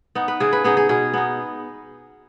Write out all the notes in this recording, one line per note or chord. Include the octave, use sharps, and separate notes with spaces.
B3 D#4
B4
C#3 G#4
B4
B3 D#4 G#4
G#4
B2 G#4
B3 D#4